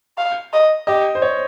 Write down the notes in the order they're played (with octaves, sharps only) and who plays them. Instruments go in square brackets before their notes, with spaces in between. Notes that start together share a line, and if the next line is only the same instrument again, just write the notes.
[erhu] F5
D#5
[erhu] G4 [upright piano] D#5
[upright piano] C5
C#5